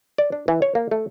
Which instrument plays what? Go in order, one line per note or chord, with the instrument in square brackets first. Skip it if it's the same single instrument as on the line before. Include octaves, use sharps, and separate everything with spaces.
[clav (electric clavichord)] D5
D4
E3
C#5
A#3
A3